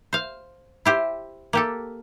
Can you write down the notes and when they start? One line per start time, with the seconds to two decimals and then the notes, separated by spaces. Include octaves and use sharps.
0.13 C5 F5
0.85 E4 G4 C5
1.53 A#3 G4 A4